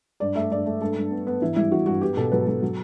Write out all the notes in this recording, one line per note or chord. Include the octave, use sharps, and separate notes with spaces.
G2 D5
A3 E5
G2 D5
A3
G2 A4
G2
B3
B3
E3 E4
G3 E4
E3 F#4
G2 F#4
B3 G4
B2 A4
F#3 B4
F#3 A4
F#3